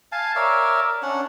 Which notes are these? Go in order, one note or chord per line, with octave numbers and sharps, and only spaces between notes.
F5 G#5 A5
A#4 C#5 D5 E5
C#4 D4 F#5